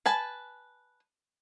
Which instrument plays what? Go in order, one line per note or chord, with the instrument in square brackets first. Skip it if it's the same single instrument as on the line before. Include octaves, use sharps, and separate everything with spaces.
[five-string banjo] B4 G#5 A5